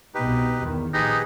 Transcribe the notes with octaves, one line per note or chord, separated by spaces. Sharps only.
C2 B2 D#4 G4 B4
E2 D#3
A#1 D#4 G4 G#4 B4